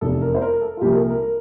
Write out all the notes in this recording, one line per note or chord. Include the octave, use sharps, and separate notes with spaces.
F1 E2 C3 A4
A#4
C5
A#4
A#4
A4
F4
C2 A#2 F3 G4
A#4
A4
A#4
A#4